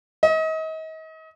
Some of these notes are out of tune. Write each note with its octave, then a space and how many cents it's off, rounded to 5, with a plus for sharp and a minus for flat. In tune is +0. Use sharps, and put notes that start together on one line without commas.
D#5 +35